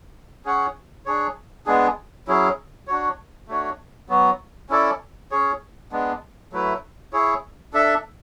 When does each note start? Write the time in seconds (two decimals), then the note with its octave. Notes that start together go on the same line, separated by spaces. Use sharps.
0.45 C#4 G#4 C#5 F#5
1.06 D4 G#4 C#5
1.66 G#3 B3 D4 G#4
2.28 F#3 C#4 E4 G#4
2.88 D4 F#4 C#5
3.48 A3 D4 F#4 C#5
4.09 F#3 B3 F#4
4.70 C#4 E4 A4 D5
5.31 C#4 G#4 C#5
5.92 G#3 B3 D4
6.53 F#3 A3 E4 B4
7.13 E4 G#4 C#5
7.73 D4 A4 E5